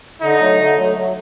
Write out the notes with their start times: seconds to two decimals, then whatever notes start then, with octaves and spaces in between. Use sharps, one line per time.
0.21 D3 D#4
0.40 F#3 A3
0.58 D3
0.76 F#3 A3
0.95 F#3